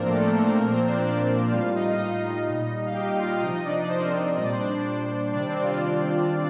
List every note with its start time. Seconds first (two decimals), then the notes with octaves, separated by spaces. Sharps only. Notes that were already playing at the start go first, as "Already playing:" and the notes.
Already playing: A2 F3 A#3 C4 D4 A#4 C5 D5
0.09 A3 A4
0.21 A3 A4
0.32 A#3 A#4
0.44 C4 C5
0.56 A#2 F3 A#3 A#4
0.72 C4 C5
0.84 C5
0.88 D4 D5
1.04 D4 D5
1.51 A2 G3 F4 F5
1.75 D#4 D#5
1.99 D#4 D#5
2.47 A#2 G3
2.86 F5
2.94 G4 G5
3.18 F4 F5
3.26 G5
3.34 F5
3.42 C3 F3 D#4 D#5
3.54 D#4 D#5
3.65 D4 D5
3.89 C5
3.97 A#4
4.06 C4 C5
4.37 A#2 G3 D#5
4.44 D5
4.52 C5
4.59 D4 D5
5.31 C3 D#3 G3 D4 D5
5.48 C4 C5
5.64 F4